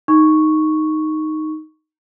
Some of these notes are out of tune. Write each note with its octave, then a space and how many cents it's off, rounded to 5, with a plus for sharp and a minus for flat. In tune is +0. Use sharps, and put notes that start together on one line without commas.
D#4 +0 C#6 +0